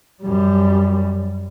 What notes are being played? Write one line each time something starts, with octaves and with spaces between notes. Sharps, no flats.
F#2 G3